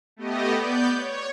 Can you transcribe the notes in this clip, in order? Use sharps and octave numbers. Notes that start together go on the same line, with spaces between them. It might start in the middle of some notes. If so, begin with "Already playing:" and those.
A3 B3 G4 D#5
B3 D5 G6
C#5